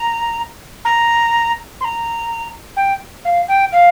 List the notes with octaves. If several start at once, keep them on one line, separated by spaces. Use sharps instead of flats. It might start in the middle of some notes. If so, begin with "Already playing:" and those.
Already playing: A#5
A#5
C6
A#5
G5
F5
G5
F5